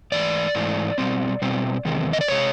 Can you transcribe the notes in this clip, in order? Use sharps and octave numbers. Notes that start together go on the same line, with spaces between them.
G#2 E3 A3 D5
G#2 E3 A3
B2 G3 C4
B2 G3 C4
E2 C3 D#3 G#3
D#5
D5
C3 G#3 C#5